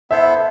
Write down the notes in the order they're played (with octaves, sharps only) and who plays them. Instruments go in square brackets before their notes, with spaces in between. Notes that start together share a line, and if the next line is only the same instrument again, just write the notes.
[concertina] B3 E4 A4 C5 [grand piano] E5